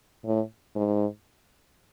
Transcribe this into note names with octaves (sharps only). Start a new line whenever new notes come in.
A2
G#2